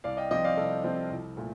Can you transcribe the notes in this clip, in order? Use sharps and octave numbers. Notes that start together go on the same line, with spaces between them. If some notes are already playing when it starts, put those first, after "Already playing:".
C2 D5 F5
D#5 G5
C3 F3 C4 D#5 G5
D5 F5
C2 A4
C3 F3 C4
C2
A#2 A3